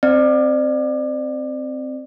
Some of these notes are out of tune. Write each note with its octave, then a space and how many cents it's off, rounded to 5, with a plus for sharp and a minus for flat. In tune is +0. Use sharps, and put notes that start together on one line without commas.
C4 +0 D5 +30